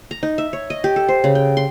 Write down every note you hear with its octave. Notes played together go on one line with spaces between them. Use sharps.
A#5
D#4
E5
C#5
D#5
G4
A4
C5
C#3
G5
C6